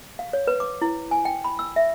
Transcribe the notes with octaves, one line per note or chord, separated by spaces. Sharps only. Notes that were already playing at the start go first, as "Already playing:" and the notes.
F5
C#5
B4
D6
E4
G#5
G5
B5
E6
E5